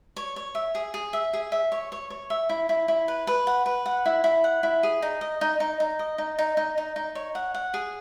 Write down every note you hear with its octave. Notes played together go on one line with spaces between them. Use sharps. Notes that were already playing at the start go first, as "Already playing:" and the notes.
C#5
C#5
E5
G#4
G#4
E5
G#4
E5
C#5
C#5
C#5
E5
E4
E4
E4
B4
B4
F#5
B4
F#5
E4
E4
F#5
E4
G#4
D#4
D#5
D#4
D#4
D#4
D#5
D#4
D#4
D#4
D#4
D#4
C#5
F#5
F#5
G#4